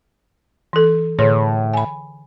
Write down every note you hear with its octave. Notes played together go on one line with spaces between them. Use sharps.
E3 A4
A2 D3 G#4 C#5
G#5 B5